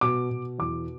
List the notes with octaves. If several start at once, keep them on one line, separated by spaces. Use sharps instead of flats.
B2 D6
B2
E2 D6